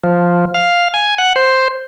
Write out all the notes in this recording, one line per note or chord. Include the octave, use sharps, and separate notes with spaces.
F3
F5
G#5
F#5
C5